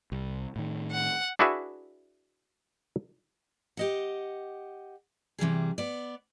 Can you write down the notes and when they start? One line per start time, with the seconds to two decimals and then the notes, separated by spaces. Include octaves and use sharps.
0.12 C2
0.56 A2 D#3
0.91 F#5
1.39 D4 E4 F#4 G#4 B4 E5
3.77 G4 D#5 F#5
5.38 C3 E3 G3 G#4
5.78 B3 D5